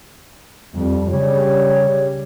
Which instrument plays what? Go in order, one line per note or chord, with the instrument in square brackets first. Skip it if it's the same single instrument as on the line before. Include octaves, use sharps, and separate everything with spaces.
[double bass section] F2 [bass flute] G3
[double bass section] C#3 G3 [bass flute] C#5